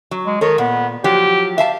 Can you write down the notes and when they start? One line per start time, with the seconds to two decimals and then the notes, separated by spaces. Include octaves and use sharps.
0.11 F#3
0.26 G#3
0.41 D#3 A4 C#5
0.58 A#2 B3
1.04 F3 F#3 G4
1.58 E5 F5 A5